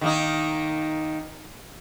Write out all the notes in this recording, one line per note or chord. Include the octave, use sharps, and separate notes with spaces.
D#3 A#3 D#4